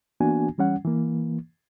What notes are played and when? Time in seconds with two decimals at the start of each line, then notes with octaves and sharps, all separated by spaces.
0.20 E3 A#3 B3 D4 F#4 G#5
0.58 E3 G3 C#4 F#5
0.84 E3 A#3